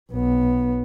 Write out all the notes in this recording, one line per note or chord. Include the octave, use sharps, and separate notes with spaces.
B1 B3